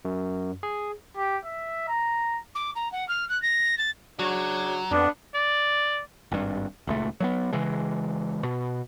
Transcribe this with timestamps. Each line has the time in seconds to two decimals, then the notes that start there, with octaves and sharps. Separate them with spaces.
0.05 F#2
0.63 G#4
1.16 G4
1.45 E5
1.88 A#5
2.55 D6
2.75 A#5
2.92 F#5
3.08 F6
3.29 F#6
3.42 A#6
3.77 A6
4.19 C#3 F#3 D4 F#4
4.91 F2 B3 D4
5.35 D5
6.32 G#1 G2
6.87 D#1 C#2 A3
7.20 F#3 A3 B3
7.53 C#3 E3 G#3
8.43 B2